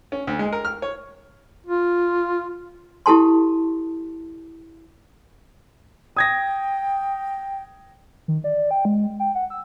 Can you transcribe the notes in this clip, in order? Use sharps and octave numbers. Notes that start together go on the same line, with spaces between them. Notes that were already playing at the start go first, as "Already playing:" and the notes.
C#4
D2
G#3
A#4
F6
C#5
F4
E4 G4 A4 A5 C6
G5 D#6 G#6 A#6
D#3
D5
G5
G#3
G5
F#5
E6